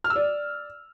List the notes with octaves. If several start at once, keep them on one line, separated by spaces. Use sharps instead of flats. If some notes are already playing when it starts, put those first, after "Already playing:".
F6
E6
D5